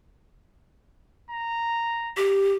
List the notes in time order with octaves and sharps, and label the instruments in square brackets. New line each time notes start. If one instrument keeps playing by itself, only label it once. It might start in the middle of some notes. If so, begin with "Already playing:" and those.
[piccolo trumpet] A#5
[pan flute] G4